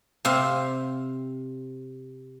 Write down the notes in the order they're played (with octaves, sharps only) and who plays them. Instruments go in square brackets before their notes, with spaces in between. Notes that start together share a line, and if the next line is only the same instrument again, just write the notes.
[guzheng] C3 C5 F5